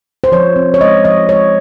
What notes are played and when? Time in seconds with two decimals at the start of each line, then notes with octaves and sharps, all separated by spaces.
0.24 C5
0.32 F3 C#5
0.56 C4
0.74 C#5
0.81 G#3 D#5
1.05 F3 D#5
1.29 G#3 C#5